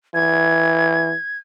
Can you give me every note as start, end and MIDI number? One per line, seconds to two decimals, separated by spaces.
0.14 1.13 52
0.14 1.38 92